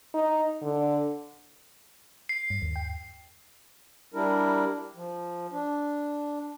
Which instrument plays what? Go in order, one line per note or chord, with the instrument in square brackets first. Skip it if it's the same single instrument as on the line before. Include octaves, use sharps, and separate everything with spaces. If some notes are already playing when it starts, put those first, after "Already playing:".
[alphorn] D#4
D3
[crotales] C7
[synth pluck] G2
D#2
G5
[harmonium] G3 D4 E4 A#4
F3
D4